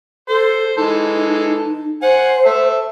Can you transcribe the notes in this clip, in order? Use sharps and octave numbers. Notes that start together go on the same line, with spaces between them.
A4 C5
E3 G#3 D#4 A4
C5 F#5 G#5
A4 E5 E6